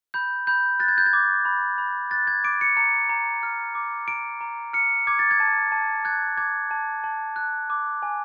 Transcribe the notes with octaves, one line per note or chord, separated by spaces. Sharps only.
B5 G6
B5 G6
F#6 A6
G#6
G6
G#6
D6
B5
B5
F#6 A6
G#6
D6 D7
C#7
A#5 C#7
A#5
F6
D6
A#5 D7
A#5
F6 C#7
D6 G#6
A6
G#6
A5
A5
F#6 G#6
D6 G#6
A5
A5
F#6
D6
G#5